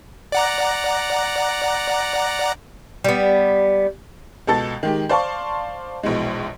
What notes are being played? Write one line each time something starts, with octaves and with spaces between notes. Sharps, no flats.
D5 F#5 A#5
G3 B3
C#2 B2 A4 A5 A6
D#3 G#3 G4
C5 D5 F5 A5 C6 C#6
A#1 B2 E3 G#3